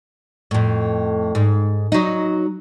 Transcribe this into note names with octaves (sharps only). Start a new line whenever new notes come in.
F2 A2
G#2
F#3 D#4